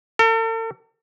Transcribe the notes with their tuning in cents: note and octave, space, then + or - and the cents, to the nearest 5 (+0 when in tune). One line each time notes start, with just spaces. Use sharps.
A4 +45